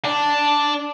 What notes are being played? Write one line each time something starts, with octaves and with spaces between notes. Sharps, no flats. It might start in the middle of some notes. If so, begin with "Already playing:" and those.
D4